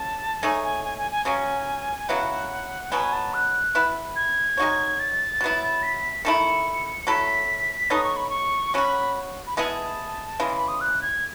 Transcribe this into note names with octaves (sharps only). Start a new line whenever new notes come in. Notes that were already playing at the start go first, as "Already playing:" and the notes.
Already playing: C#3 A5
A3 D#4 G#4 C#5 G#5
G#5
G#5
G#5
G#5
C#3 F#3 C#4 G#5
C#3 F#3 B3 E4 F#5
B2 F#3 B3 G#5
A5
F#6
B3 E4 B4
G#6
G#3 D#4 F#4 C#5
A6
F#3 B3 E4
B6
D#3 A3 E4 C#7
F#3 A3 E4 A4 B6
B3 D#4 A4 C#5 D#6
C#6
B5
C#6
F#3 C#4 F#4 B5
B5
G#3 B3 E4 G#4 A5
C#3 E3 G#3
B5
D#6
F#6
G#6